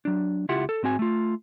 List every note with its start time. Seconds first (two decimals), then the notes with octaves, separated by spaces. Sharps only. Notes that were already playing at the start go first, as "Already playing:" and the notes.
0.05 F#3 D4
0.49 C#2 E4 F4 G4 F#5
0.69 A4
0.83 G#2 C4 F#4 G#5
0.99 A3 F4